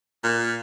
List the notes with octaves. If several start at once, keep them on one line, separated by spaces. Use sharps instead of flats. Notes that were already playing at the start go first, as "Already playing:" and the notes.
A#2